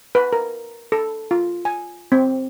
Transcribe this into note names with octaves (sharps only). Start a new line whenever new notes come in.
B4
A#4
A4
F4
G#5
C4